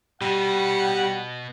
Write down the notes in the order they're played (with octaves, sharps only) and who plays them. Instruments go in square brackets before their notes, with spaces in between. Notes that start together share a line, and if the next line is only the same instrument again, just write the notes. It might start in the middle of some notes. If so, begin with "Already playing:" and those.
[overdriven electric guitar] B2 [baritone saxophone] G3 [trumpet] F#5